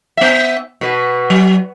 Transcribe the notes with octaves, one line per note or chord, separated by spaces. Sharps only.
B3 E5
B2 B4
F#3